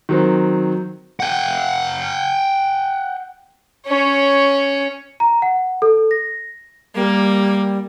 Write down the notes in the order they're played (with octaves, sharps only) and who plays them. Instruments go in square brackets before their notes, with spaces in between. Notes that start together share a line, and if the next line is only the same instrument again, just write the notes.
[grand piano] D#3 F#3 C4
[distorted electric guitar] F#5 G5
[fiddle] C#4 C#5
[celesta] A#5
F#5
A4
A#6
[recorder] G3 [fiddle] A#3